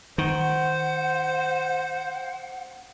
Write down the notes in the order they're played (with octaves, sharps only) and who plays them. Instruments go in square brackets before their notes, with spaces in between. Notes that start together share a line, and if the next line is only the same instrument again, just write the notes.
[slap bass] D#3 [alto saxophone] C5 [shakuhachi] F#5